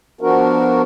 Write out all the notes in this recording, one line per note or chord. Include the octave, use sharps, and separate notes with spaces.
F3 B3 D4 F#4 A#4